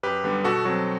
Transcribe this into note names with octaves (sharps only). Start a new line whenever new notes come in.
F#2 G4 B4
D3 G3 B3
B2 F#4 A4
F#3 C4 F#4